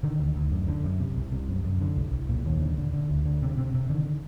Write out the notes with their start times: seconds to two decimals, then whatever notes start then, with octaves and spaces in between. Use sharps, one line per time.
0.03 D3 D#3
0.19 D2
0.36 D2
0.51 F#2 D3
0.68 D3
0.84 F#2
1.00 C3
1.16 C2
1.32 C3
1.49 F#2
1.64 F#2
1.81 D3
1.96 C2
2.13 C2
2.29 A#2
2.45 D#2 D#3
2.61 D3
2.78 D3
2.93 D3
3.09 D2
3.26 D3
3.42 C3
3.58 C3
3.74 C3
3.90 D3 D#3